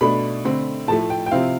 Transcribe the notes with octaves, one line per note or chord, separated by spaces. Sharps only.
B2 A3 D4 B5
D3 A3 C4
A2 F3 A3 A5
G5
G5
C3 F3 C4 E4 F5